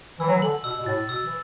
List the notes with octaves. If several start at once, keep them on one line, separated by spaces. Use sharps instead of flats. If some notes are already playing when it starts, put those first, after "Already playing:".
E3 E6
F#3
E3
D3 F#7
B2 E6
B2
A2 A6
B2 E6
E3